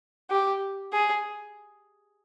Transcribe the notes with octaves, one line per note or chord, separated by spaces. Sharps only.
G4
G#4